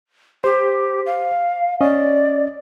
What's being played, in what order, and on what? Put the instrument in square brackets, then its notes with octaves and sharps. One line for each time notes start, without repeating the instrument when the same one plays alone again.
[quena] G4 [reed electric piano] C5
[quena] F5
[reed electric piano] C#4 D#5 [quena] D5